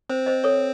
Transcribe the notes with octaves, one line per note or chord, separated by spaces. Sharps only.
C4 C5
C5 D#5
A4 C#5